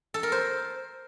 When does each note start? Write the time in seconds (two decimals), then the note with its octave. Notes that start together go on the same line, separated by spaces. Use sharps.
0.14 A4
0.23 A#4
0.32 C5